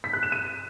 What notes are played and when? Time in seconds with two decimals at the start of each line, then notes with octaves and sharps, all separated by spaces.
0.04 B6
0.13 F#6
0.23 E7
0.32 D#7